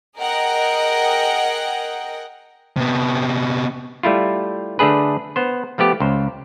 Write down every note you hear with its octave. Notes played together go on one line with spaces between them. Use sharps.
G#4 A#4 D#5 F#5 G5
C3 B3
G3 A3 E4 F4
D3 A3 D4 G#4 B4
B3 C5
F3 A3 B3 G4
C#2 C5